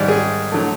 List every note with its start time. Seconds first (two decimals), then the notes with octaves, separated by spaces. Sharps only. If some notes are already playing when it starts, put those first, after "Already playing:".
Already playing: G#2 D#3 G3 D5
0.08 G#4
0.52 D3 F#3 A3